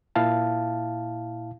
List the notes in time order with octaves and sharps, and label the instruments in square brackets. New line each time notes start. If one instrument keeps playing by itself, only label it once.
[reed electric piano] A#2 E4 F5 A5